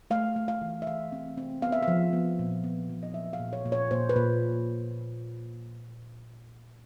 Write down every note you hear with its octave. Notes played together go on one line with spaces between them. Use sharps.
A3 F5
A3
F5
E3
E5
E3 F5
C4
C4
B3 F5
E5
F5
F3
B3
A#2
B3
F3
D#5
F#3 E5
F5
A#2
C#5
A#2
C#5
A#2 C5
B4
A#2